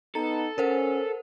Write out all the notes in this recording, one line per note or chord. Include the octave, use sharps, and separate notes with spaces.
B3 D#4 A4 A#5
C#4 A#4 C5 F#5